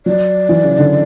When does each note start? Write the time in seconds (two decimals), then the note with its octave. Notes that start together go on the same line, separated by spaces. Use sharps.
0.06 F#3 D5
0.49 E3
0.64 C#3
0.79 D3